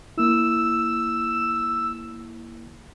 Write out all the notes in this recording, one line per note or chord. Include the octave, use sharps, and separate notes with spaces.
A#3 E4 E6